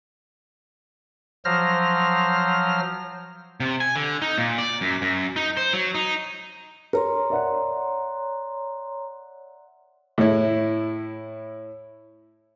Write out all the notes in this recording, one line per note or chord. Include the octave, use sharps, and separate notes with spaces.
F3 F#3 C5 F6 A#6
C3
G#5
D3
D#4
A#2
D5
F#2
F#2
D#4
C5
F#3
D#4
A#4 C#5 A#5 C6
D5 E5 F#5
A2 E4